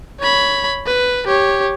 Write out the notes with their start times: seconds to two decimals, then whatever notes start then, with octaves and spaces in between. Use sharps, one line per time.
0.20 C#5 B5
0.87 B4
1.27 G4 C#5